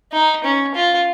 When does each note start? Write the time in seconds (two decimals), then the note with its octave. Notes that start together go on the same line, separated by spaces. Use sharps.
0.12 D#4
0.44 C#4
0.75 F4